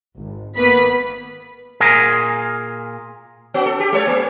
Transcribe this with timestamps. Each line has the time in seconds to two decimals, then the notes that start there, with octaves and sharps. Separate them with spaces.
0.17 G#1
0.57 G#1 A#3 B3 B4 B5 B6
1.80 A#2 G#4 A#4 G#5
3.54 B3 F#4
3.66 A4
3.80 G4
3.93 G#3 A4 C#5
4.07 A#3